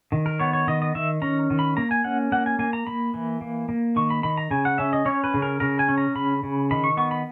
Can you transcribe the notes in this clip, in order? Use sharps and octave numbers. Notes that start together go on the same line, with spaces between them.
D#3
A#4
B3 C#5
C#5
D#3 D#5
D#5
D#3 E5
C#4 A#5
D#3
B5
A#3 A#5
G#5
C#4 F#5
A#3 F#5
G#5
A#3 G#5
A#5
A#3 B5
E3
A#3
A#3
D#3 C#6
B5
D#3 B5
A#5
C#3 G#5
F#5
C#4 E5
D#5
C#4 C#5
B4
C#3
A#4
C#3 A#4
G#5
C#4
A#5
C#3 B5
C#3
D#3 B5
C#6
B3 C#6
B5